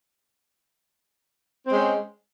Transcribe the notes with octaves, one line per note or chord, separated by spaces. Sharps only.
G#3 C4 C#4